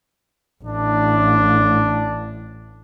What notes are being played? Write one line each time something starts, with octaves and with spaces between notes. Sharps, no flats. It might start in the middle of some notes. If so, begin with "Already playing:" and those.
A1 D4